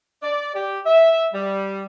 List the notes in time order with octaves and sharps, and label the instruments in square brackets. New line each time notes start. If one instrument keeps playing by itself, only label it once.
[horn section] D5
G4
E5
G3